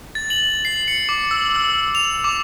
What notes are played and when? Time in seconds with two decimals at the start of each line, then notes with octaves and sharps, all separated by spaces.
0.15 A6
0.30 F#7
0.65 C7
0.88 C#7
1.09 D6
1.31 E6
1.56 E6
1.95 F7
2.24 D6